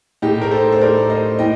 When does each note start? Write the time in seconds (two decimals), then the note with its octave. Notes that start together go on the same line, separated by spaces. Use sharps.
0.22 A2 D#4 G4
0.41 A#4
0.51 A4 C5
0.72 C5
0.81 A2 A#4 D5
1.10 C5 D#5
1.39 A2 D#5 G5